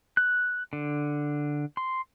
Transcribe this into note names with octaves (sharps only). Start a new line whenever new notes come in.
F#6
D3
C6